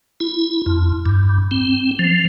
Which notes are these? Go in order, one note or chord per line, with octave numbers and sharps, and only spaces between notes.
E4
F2
G2
C4
F3